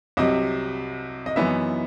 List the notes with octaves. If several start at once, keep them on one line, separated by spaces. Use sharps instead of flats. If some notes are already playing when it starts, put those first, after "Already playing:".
C2 C3 F#3 D#5
D#5
F#2 E3 B3 D#4 E5